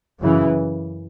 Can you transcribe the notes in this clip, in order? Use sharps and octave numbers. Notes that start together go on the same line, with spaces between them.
F#2 C#3 E3